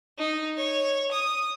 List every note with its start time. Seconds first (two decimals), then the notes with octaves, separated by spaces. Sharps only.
0.18 D#4
0.57 C#5
1.11 D#6